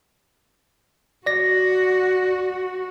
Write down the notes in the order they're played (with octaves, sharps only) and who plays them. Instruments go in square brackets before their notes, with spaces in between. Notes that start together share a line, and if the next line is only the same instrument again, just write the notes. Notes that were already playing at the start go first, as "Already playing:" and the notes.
[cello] F#4 [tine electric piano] D5 A#6